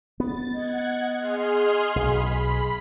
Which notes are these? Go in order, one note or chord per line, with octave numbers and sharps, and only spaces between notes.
B3 A6
D#5 F#5 G#6
G#4 C6 F6
B1 B5